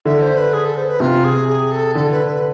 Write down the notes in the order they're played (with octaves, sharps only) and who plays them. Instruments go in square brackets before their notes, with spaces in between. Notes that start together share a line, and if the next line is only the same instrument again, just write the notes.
[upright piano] D3 [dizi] E5
[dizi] C5
B4
G#4
A4
C5
B4
[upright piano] C3 [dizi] F4
[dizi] G#4
G#4
A4
[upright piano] D3 [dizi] A4
[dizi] B4
B4